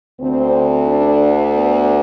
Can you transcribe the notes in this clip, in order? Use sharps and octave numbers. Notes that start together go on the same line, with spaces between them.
D2 D3 C4
D4
B3